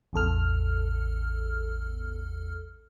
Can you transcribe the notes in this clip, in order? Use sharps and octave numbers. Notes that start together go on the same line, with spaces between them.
A1 E2 A4 F6